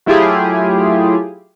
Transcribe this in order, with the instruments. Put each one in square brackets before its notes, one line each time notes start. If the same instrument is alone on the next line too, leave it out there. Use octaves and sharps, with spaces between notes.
[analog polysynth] F#3 A3 E4 F4 G4 G#4